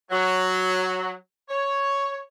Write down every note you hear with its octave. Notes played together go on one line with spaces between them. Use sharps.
F#3
C#5